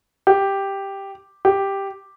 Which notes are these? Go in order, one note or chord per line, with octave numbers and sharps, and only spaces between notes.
G4
G4